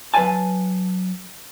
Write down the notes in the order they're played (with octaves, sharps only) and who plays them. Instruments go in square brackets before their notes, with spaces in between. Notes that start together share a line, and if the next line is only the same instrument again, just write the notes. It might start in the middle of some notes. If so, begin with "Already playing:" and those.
[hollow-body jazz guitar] F#3 B4 D5 F5 G#5 A5